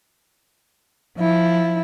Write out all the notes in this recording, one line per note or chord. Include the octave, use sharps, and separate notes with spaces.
F3 E4